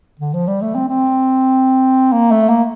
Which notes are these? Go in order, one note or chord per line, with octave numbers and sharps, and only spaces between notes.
D3
F3
G3
A3
C4
C4
A#3
A3
A#3